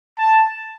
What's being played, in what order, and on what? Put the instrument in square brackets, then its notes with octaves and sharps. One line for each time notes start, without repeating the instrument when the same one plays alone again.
[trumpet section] A5